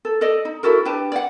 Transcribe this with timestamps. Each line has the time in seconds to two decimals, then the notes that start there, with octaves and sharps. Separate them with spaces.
0.05 A4
0.21 A4 D5 D#5
0.45 D#4
0.63 E4 F#4 A4 A#4
0.85 D4 G4 B4 A5
1.12 D5 F#5